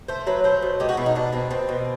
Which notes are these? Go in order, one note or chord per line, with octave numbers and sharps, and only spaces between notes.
A3 C5
F#3 B4
A3 C5
B2
G#3 G4
F#4
B2 E4
D#4
B2 D4
B2 C4
B2 C4
B2